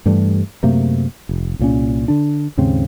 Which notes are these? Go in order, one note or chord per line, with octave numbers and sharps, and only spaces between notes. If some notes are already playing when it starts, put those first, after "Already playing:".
G2 E3 G3 A3
F#2 C3 A3 A#3
F1
C2 A#2 C#4
D3 D4
D#2 G#2 C#3 C4